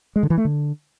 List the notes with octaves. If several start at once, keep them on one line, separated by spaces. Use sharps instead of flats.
G#3
D3
E3
A3
D3